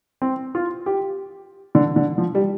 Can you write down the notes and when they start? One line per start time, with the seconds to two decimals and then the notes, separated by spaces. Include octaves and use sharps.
0.22 C4
0.55 F4
0.86 G4
1.75 D3
1.96 D3
2.18 F3
2.35 G3